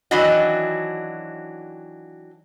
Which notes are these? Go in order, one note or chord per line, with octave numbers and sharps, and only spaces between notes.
D#3 E3 F#3 D4 F#4 D#5